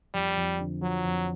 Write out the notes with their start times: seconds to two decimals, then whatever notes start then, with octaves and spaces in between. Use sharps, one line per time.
0.14 F2 G3
0.37 F2
0.59 D3
0.82 F3 F#3
1.05 F2